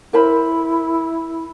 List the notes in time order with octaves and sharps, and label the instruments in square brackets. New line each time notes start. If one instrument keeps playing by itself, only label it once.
[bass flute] E4 [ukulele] A#4 C5 B5